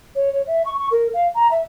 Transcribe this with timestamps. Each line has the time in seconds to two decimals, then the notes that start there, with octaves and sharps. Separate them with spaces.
0.15 C#5
0.32 C#5
0.47 E5
0.65 C#6
0.78 C#6
0.91 A#4
1.14 F5
1.35 A#5
1.51 E5